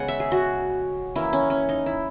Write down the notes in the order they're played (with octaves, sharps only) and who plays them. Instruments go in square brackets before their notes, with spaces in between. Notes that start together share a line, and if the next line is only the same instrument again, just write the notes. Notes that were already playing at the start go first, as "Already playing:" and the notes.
Already playing: [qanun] C#3 G#3 B3 F#5 G#5
E5
G#4
F#4
E3 A#3 C#4 E4
C#4
C#4
D#4
E4